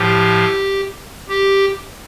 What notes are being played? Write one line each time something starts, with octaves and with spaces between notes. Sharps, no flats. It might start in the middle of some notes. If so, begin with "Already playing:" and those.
Already playing: A2 F3 G4
G4